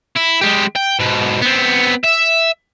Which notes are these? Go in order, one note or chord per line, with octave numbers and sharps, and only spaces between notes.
E4
G#3 G4
G5
G#2 B2
B3 C4
E5